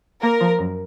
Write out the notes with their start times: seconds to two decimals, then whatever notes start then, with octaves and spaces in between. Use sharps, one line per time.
0.23 A#3 A#4
0.41 F3
0.59 F#2